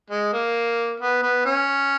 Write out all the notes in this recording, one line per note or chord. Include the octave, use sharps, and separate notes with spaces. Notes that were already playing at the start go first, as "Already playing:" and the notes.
G#3
A#3
B3
B3
C#4